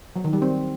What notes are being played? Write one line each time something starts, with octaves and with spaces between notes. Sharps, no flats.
F#3
D#3
G3
C4